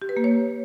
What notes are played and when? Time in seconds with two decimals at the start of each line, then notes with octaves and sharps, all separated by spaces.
0.02 G4
0.09 B4
0.17 A#3
0.24 C#5